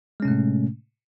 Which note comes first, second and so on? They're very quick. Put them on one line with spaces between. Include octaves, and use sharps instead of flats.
G#3 C#4 C3 A3 A2